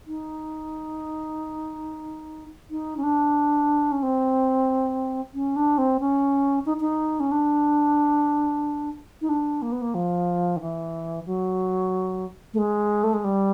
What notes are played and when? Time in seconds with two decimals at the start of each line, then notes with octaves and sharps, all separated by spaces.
0.07 D#4
2.71 D#4
2.97 C#4
3.03 D4
3.92 C#4
4.03 C4
5.34 C#4
5.56 D4
5.78 C4
6.00 C#4
6.66 D#4
6.81 D#4
7.20 C#4
7.32 D4
9.21 D#4
9.29 D4
9.62 A#3
9.72 B3
9.82 A#3
9.94 F3
10.56 D#3
10.61 E3
11.26 F#3
12.54 A3
12.58 G#3
13.04 A3
13.14 G#3
13.24 G3